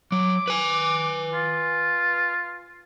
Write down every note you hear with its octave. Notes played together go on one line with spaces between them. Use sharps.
F#3 D6
B4 G#5
F4